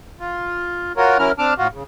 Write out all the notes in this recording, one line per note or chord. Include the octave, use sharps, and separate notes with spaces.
F4
F4 F#4 A#4 C#5
F#3 C#4 E4 A#4 F6
C4 D4 A5 D6 F6
A2 F4 F#4
C#3